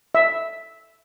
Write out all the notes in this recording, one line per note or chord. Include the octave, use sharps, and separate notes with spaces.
E5